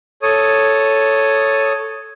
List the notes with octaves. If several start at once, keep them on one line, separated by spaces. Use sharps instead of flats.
A4 C#5 D#6